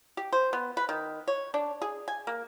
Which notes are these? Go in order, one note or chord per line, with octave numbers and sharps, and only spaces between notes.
G4
C5
B3
B4
D#3
C#5
D4
G#4
G#5
A#3